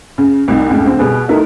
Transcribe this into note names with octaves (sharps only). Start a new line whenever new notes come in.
C#3
C2 D#4
C#2 A2
D3 C4
B2 G3 B3 G#4
A3 B3 D#4 E4 A4 A#4